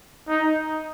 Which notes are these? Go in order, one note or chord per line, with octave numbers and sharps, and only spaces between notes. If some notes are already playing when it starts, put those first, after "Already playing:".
D#4